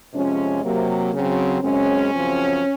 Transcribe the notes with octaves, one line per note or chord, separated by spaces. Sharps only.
F2 C3 F3 G#3 C#4
C3 F#3 A#3
C#3 F#3 C4
F#2 C#3 G#3 C4 C#4
F#2 C#3 F3 C4